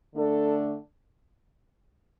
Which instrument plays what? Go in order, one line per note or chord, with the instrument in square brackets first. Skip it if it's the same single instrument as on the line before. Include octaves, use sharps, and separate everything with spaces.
[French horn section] D3 A3 D4 A4